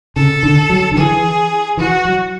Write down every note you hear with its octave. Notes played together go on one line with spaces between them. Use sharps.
C#3 A4
D3
F#3
D3
E3 G#4
E3 F#4
F#3